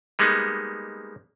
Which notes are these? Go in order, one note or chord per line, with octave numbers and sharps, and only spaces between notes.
G3 G#3 A#3 B3 D#4